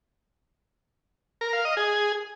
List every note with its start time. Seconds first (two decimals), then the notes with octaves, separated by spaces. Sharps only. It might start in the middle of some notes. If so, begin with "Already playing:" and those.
1.41 A#4
1.53 F5
1.65 D#5
1.77 G#4